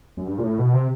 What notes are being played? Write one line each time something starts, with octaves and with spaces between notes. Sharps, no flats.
F#2
G2
A#2
A2
B2
C3